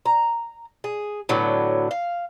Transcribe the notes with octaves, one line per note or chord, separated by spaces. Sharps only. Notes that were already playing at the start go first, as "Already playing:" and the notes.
A#5
G#4
A2 D3 F#3 B3
F5